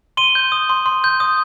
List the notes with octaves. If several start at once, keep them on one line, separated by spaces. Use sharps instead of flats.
C6 D#7 G7
G6
D#6
C6
C6
G6
D#6